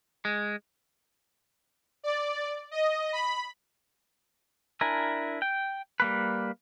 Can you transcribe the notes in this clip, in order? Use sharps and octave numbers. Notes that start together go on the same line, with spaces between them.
G#3
D5
D#5
B5
D4 E4 A#4 G#5
G5
G3 A#3 B4